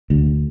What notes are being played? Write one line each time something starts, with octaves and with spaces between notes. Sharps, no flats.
D2